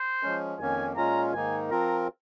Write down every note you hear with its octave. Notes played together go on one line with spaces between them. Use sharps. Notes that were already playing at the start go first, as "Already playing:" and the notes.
Already playing: C5
F3 G#3 C#4
F2 D#3 A#3 C#4 G#5
A#2 G#3 C#4 F4 A#5
G#2 D#3 A#3 D#4 G#5
F3 C4 F4 A#4 A#5